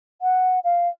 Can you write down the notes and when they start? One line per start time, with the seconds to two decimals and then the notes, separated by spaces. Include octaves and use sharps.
0.22 F#5
0.64 F5